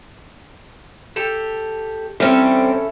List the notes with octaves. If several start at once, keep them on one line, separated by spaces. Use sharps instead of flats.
G4 A4
E3 G3 C4 C#4 A4